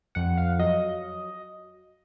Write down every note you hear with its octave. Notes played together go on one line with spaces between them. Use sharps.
F2 F#5
F5
F#3 D#5